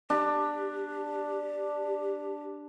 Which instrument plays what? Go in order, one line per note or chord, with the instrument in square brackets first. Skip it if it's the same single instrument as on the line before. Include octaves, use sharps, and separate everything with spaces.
[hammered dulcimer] D4 [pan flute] G4